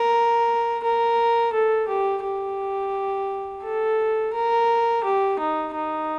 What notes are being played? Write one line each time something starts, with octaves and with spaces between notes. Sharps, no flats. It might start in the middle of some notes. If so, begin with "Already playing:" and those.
Already playing: A#4
A#4
A4
G4
G4
A4
A#4
G4
D#4
D#4